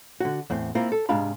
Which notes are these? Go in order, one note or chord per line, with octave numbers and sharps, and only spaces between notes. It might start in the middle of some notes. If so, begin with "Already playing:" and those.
D3 F#4
E2 A2 C4
A#3 C4 E4 F4
A4
G#2 C3 G#3 D4 F5 B5